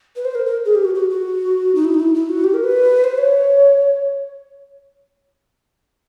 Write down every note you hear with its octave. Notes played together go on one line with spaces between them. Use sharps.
B4
C5
A#4
A#4
G#4
G4
F#4
F#4
F#4
D#4
E4
D#4
E4
E4
F#4
G4
A#4
B4
C5
C#5